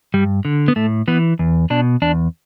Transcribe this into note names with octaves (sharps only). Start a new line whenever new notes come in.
G2 G3
D3
B3
A2 A3
E3 B3
E2
B2 D4
E2 D4